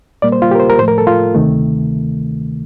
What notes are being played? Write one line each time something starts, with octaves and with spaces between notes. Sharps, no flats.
A#2 G3 A#3 D5
C5
F4
G4
A#4
C5
A#4
A2 F3 A3 C5
A#4
A4
F4
D2 C3 D#3 A3